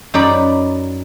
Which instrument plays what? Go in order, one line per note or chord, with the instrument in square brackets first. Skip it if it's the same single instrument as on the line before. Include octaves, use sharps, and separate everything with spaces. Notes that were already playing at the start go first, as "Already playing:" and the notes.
[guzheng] F#2 D#4 D5 B5